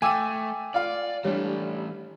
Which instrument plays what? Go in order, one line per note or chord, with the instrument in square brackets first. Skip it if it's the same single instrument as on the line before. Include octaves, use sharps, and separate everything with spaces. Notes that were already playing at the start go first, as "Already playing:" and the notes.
[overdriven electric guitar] A3 [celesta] G5 D6 [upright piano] G#5 E6 D#7
[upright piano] F4 F5 [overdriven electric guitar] D5
[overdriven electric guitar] E3 A3 [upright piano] G3 D4 [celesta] C#5